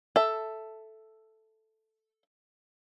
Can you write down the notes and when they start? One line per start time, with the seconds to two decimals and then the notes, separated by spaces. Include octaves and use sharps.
0.16 A4 E5